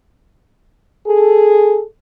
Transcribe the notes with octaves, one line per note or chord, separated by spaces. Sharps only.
G#4 A4